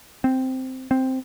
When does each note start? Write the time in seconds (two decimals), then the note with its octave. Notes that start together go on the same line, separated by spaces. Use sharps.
0.24 C4
0.91 C4